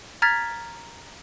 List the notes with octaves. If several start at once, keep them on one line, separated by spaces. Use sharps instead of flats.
A#5 F6 G#6 A6 B6